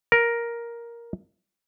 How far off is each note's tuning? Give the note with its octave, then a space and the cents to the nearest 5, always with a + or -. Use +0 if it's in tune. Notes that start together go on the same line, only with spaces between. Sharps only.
A#4 +10